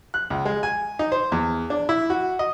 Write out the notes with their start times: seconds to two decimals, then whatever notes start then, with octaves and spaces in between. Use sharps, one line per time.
0.14 F#6
0.30 C#2
0.45 G#3
0.63 G#5
0.99 D#4
1.12 C5
1.32 E2
1.70 D4
1.89 E4
2.10 F#4
2.39 D#5